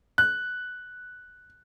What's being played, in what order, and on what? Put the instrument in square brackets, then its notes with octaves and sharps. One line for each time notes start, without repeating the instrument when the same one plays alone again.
[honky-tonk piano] F#6